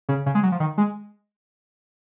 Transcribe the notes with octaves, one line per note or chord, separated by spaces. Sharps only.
C#3
C#3
G#3
F#3
F3
D#3
G#3